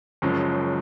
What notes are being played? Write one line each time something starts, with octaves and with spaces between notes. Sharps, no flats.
F#1 F#2 F3 G#3 C#4